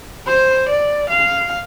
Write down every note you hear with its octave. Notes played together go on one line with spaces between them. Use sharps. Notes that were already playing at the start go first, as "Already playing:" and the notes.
C5
D5
F5